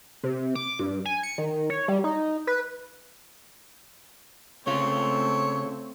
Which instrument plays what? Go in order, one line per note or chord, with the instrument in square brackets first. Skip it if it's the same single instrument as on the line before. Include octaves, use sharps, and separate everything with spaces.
[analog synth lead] C3
D6
G2
G#5
C#7
D#3
C#5
G3
D#4
B4
[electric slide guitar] C#3 F4 [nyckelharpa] A3 C4 [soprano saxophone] C#5